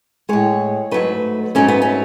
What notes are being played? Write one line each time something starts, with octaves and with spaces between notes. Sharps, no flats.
A2 G#3 C#5
G#2 F#3 A3 B4
G#2 F#3 A3 C#4
B3
C#4